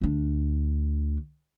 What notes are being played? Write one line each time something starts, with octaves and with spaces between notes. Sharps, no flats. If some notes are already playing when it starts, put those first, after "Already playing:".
D2 D4